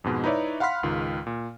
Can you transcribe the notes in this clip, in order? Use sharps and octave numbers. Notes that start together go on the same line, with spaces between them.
F2 G#2 B2 G#3
D#4 E4 B4 C#5 D5 E5
F5 F#5 B5 C6 F6 B6
C#2 G#2 D#3 F4
A#2